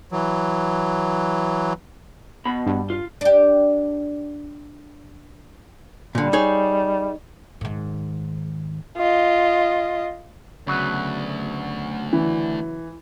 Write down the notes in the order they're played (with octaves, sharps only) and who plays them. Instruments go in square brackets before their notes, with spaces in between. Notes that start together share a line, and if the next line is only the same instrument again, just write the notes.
[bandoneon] E3 F#3
[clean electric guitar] B2 B5
[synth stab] G2
[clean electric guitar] F4
[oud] D4 G4
[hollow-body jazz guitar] A#2 D3 [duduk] G3
[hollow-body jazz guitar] D#4 G#4 C#5
[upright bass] G#2 D#3
[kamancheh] F4 D#5
[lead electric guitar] D2 [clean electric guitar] C#3 F#3 B3
[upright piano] E3